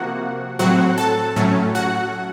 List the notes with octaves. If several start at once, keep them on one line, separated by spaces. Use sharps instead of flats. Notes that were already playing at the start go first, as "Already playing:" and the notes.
Already playing: C3 F3 A#3 F#4 F#5
A2 F#3 C4 F#4 F#5
A4 A5
A2 F#3 A3 C#4
F#4 F#5